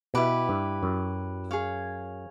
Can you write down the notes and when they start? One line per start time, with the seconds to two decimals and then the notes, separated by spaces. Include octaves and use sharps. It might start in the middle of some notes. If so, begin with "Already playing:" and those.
0.14 B2 E4 G4 B4
0.49 G2
0.83 F#2
1.51 G#4 C#5 F5